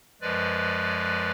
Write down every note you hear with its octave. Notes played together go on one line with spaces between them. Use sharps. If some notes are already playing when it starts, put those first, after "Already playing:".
F#2 F3 G#3 B4 D5